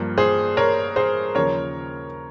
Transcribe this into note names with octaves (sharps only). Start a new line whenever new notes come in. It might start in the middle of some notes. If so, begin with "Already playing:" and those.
Already playing: G2 F3 A#3
G#4 C5
A#4 C#5
G#4 C5
D#2 C#3 F3 A#4 C#5